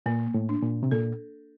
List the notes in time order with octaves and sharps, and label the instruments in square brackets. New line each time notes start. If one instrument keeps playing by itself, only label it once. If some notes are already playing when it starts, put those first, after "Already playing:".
[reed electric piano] A#2 [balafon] A#3
[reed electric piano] A2
[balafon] D4
[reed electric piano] A#2
C3
[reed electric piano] A#2 [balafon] A4